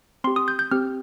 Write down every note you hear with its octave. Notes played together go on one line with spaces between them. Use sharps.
C4 G4 C6
D#6
G6
G6
C4 G4 F6